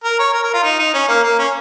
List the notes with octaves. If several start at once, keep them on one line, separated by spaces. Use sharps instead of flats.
A#4
C#5
A#4
A#4
F4
D#4
D#4
C#4
A#3
A#3
C#4